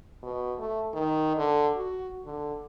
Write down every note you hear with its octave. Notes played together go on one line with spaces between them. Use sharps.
B2
A3
D#3
D3
F#4
D3